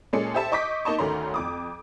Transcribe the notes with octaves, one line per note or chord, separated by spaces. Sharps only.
A#2 G#3 C#4 A4 C#7
G4 C5 E5 A5
D#5 C#6 D6 G6 B6
A#3 D#4 D#5 A5 C#6
D2 D#3 A3 C#4 A#5 C6
F2 D6 D#6